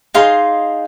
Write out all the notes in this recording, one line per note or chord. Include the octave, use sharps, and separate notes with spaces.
D#4 G#4 F5 C6